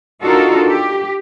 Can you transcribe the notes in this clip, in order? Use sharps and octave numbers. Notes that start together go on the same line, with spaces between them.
D4 D#4 F4 F#4 A4 A#4
G4